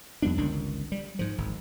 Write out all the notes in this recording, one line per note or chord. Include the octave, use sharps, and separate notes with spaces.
F2 G3 B3 D4
G1 C#2 D#3 D4
G3
G#2 F3
G#1